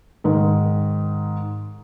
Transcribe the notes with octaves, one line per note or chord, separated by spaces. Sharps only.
G#2 D#3